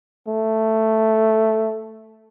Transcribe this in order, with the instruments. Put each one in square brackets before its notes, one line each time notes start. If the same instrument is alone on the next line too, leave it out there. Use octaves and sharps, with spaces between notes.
[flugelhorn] A3